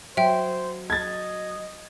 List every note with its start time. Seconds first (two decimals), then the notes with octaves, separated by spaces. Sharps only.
0.17 F#3 C5 E5 G5
0.90 D#5 G#6 A6